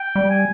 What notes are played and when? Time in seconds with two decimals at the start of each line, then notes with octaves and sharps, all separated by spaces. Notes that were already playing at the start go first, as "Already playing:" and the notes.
Already playing: G5
0.16 G3
0.30 G#5